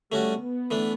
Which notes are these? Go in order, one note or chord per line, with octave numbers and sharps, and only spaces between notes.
G3 A3 C#4 F#4
B3
E3 A3 D4